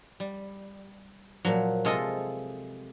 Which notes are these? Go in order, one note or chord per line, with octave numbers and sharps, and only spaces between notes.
G3
A#2 F3 F#3
C3 G#3 F4 G#4 A4 D#5